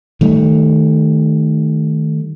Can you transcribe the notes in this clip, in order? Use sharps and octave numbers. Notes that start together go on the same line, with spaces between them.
D#3 G3 A3